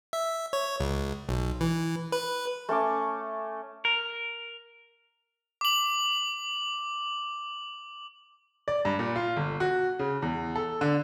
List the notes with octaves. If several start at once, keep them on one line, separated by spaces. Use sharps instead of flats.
E5
C#5
C#2
B1
E3
B4
A3 C#4 C#6 D6
A#4
D6 F#7
D5
G2
A#2
F4
G1
F#4
C#3
E2
A4
D3